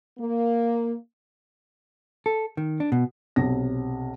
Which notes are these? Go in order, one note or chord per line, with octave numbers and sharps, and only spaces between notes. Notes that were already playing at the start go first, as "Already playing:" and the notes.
A#3
A4
D#3
D4
B2
B1 C3 A#6